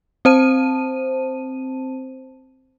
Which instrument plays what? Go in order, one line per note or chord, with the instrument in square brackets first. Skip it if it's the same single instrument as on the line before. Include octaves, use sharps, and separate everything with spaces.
[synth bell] C4 C5 A5 D#7